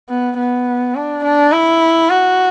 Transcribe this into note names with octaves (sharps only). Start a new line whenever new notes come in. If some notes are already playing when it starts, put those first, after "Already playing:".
B3
B3
D4
D4
E4
F#4